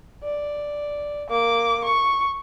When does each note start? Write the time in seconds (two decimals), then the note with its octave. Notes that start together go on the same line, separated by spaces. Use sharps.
0.23 D5
1.30 A#3 D6
1.85 C#6